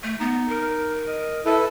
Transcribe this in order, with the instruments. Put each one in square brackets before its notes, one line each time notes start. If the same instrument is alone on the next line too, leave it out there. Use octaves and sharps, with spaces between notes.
[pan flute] A3
[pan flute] B3 [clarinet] D#4
[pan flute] A#4
[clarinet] D#5
[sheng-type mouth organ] E4 A4 [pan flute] B4